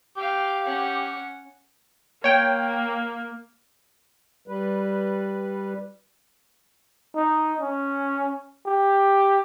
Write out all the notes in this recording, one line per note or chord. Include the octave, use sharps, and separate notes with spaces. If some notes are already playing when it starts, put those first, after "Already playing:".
G4 F5 G5
C#4 F#5
A#3 C#5 G5
G3 B4
D#4
C#4
G4